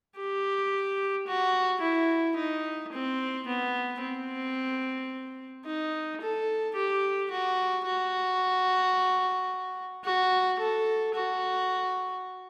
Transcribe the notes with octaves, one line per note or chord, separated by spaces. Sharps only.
G4
F#4
E4
D#4
C4
B3
C4
D#4
A4
G4
F#4
F#4
F#4
A4
F#4